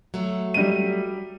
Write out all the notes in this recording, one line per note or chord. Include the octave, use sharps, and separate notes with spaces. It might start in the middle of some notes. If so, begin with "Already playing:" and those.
F#3 A3
G3 D#7